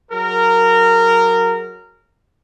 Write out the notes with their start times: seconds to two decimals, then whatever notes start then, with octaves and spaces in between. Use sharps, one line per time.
0.12 F#3 G#4 A#4